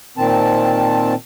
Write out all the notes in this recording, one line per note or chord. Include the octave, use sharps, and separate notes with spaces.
A#2 D#3 C4 A5